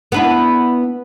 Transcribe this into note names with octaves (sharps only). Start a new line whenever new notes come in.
B3 D4 E4